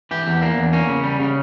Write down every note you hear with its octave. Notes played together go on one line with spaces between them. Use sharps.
E3 G4
E2
A#3 D4
E2
A#3 C#4
C#3
G3
C#3